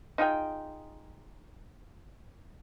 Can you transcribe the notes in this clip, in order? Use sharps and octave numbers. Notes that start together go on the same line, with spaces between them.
D#4 F4 G#4 G5